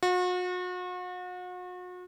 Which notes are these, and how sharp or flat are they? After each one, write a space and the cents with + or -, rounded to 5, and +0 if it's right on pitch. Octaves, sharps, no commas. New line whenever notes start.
F#4 -40